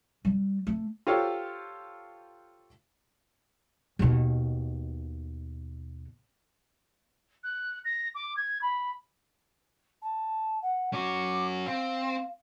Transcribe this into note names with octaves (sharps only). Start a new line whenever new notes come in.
G3
A3
F4 G4 A4 C5 C#5 F5
D#2 B2
F#6
A#6
D6
G#6
B5
A5
F#5
C#4 F#4 D6
C4 F5